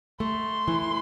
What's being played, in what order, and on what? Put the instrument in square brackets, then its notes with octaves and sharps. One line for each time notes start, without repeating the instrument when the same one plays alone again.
[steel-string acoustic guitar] A3 [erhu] C6
[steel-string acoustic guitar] E3